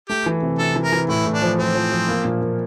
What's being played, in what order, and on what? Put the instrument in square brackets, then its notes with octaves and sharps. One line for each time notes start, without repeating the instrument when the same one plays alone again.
[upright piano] A3 [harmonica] G4
[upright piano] E3
C3
[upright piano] C3 [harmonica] A4
[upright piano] E3
[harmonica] A#4
[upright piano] E3
[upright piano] A2 [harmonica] E4
[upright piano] A2
[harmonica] D4
[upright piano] F3
[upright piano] F3 [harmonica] C4
[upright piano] F3
F3
A#3
A#2
A#3